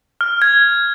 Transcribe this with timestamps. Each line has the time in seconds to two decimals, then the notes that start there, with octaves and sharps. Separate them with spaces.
0.21 F6
0.42 G#6